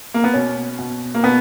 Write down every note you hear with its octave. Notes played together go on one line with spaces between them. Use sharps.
A#3
B3
B2 C#4
B2
A#3
B2 B3